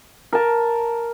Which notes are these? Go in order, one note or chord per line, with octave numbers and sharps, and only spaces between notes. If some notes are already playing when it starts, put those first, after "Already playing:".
A#4 A5